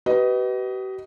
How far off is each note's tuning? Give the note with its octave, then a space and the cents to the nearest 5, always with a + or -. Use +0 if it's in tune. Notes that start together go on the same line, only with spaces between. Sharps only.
G4 -45 B4 +5 D#5 +10